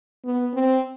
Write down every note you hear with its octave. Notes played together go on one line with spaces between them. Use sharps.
B3
C4